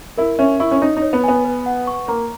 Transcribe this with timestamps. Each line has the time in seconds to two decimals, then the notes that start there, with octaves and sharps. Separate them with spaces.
0.18 E4 A#4
0.39 C#4 E5
0.60 E4 C#6
0.71 C#4
0.82 D#4 C#5
0.97 D#4
1.02 C#5
1.13 B3
1.24 B3 G#5
1.45 B4
1.66 F#5
1.87 C#6
2.08 A#3 A#5